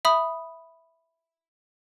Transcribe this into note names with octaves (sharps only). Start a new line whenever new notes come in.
E5 B5 D#6